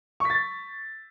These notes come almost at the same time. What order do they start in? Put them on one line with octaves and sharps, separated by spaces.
C#6 B6 A6